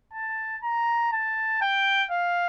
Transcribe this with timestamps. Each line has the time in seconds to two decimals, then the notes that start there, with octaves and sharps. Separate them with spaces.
0.14 A5
0.63 A#5
1.12 A5
1.62 G5
2.11 F5